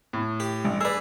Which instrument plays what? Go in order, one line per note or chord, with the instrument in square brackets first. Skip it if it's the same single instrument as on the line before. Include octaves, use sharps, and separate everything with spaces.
[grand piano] A2
[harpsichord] G4
[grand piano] A1 [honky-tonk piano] G2
[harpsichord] G#4 B4 [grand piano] D5 E6